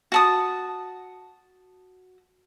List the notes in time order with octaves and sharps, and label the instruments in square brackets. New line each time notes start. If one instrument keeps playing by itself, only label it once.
[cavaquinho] F#4 A5 D#6